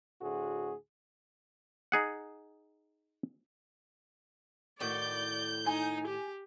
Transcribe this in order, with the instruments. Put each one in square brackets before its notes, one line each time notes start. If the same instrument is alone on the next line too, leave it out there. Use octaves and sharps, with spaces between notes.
[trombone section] D2 A2 F#4 G#4
[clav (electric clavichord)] D#4 G#4 F#5
[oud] A2 D#3 F#4 [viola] D5 [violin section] G6
[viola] D#4 [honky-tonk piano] G#5
[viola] G4